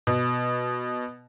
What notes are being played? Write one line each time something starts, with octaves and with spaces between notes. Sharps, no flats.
B2